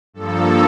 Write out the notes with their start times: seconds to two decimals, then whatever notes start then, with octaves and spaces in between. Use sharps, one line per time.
0.14 G2 F3 A#3 A4